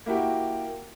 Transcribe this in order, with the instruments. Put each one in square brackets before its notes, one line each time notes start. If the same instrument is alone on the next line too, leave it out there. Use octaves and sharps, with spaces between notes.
[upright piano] A#3 E4 F#4 G4